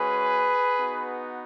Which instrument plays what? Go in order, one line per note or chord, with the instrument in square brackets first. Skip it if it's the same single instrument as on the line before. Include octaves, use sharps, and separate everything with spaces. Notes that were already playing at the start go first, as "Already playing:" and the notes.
Already playing: [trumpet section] G#3 C#4 F#4 G#4 B4
B3 D#4 F#4